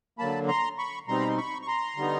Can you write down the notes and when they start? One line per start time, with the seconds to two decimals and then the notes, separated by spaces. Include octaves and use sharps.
0.18 D3 F#3 A#3 A5 B5
0.48 A#5 C6
0.78 B5 C#6
1.08 B2 G3 C4 D#4 A#5 C6
1.20 B5
1.28 C6
1.37 B5 C#6
1.62 C#6
1.67 A#5 C6
1.97 D3 G3 B3 D#4